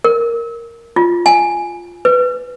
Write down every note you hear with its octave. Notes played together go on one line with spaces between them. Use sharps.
A#4
F4
G#5
B4